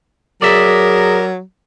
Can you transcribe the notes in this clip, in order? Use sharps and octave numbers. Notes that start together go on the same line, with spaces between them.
F#3 G#4 A#4 D5 E5